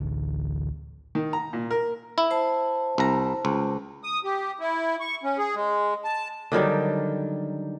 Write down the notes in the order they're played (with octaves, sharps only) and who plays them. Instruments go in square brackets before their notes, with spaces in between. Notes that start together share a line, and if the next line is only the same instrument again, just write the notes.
[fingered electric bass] A1 D2
[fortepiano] D#3
A#5
A#2
A#4
[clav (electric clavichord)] E4
[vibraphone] C5 A5
[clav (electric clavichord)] C2 A#5
C#2
[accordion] D#6
G4
E4
C#6
C#4
G#4
G#3
A5
[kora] D3 D#3 F#3 G3